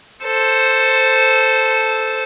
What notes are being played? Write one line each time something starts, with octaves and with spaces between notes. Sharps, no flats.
A4 C5